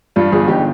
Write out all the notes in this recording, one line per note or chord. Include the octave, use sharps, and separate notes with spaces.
G2 D4 F4
G1 F4 G#4
G1 D#4 G4